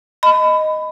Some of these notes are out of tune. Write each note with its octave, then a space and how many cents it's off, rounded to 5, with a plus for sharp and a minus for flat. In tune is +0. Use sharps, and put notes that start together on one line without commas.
D#5 +0 B5 +20